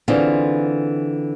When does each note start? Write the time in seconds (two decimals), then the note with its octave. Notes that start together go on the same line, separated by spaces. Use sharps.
0.08 D3 E3 C4 F4 G#4